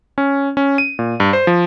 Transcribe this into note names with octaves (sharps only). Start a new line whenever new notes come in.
C#4
C#4
D#7
A#2
G2
C5
F3